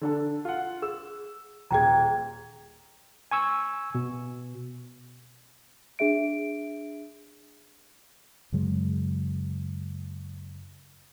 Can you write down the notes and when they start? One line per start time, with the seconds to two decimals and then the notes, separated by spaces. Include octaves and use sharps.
0.01 D3 D4 A4
0.45 F4 F#5
0.82 G#4 E6
1.71 D#1 G#4 G5 A#5 G#6
3.31 G#5 C#6 E6
3.95 B2
5.99 D4 G#4 E5 D7
8.52 F#2 C#3 F#3 G#3